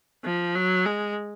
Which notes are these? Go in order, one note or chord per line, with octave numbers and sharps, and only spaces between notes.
F3
F#3
G#3